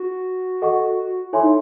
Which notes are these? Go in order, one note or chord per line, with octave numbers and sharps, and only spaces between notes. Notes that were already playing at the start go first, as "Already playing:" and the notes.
Already playing: F#4
A4 D#5 F#5 C#6
E4 A4 C#5 E5 G#5 C6
D#4